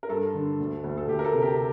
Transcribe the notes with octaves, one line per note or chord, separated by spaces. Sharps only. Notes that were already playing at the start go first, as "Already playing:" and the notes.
A#4
G2 A4
D3
D2
D2
A4
D2 G4
A#4
A4
C3
G4